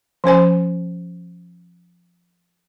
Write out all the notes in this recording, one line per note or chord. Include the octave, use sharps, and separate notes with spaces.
F3 C#4 C5 G#5